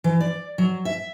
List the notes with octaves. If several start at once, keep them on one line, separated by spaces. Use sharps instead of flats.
E3
D5
F#3
E5